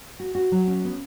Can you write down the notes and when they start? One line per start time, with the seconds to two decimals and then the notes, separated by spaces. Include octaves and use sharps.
0.20 F#4
0.35 F#4
0.52 F#3
0.67 C#4
0.85 B3